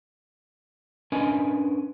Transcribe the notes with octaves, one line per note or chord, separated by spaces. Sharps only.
C#4 D4 A#4 B4 D#5 G#5